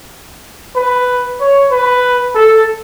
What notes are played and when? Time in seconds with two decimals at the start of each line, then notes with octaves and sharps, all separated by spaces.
0.76 B4
1.40 C#5
1.71 B4
2.35 A4